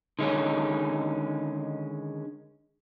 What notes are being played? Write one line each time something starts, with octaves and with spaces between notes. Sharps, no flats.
D3 D#3 G#3 C4 C#4